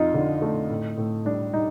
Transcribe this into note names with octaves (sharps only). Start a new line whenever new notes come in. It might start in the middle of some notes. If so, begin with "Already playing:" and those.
Already playing: F2 F3 D#4 F4
D3
A3
A2
A2
G3 D4
G3 D#4